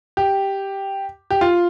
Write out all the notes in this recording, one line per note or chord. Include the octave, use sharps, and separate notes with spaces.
G4
G4
F4